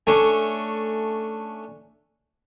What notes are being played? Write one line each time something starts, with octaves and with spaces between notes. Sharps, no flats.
A3 C#4 D4